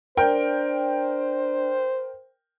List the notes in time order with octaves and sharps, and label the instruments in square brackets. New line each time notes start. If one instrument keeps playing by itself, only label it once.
[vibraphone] D4 D5 [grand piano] A#4 G5 [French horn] C5